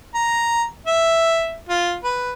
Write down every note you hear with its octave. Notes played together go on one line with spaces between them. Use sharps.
A#5
E5
F4
B4